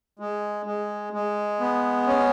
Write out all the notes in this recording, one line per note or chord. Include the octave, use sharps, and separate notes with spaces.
G#3
G#3
G#3
B3
C#4